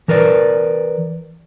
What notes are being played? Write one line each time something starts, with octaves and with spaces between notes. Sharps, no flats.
E3 A#4 B4 D5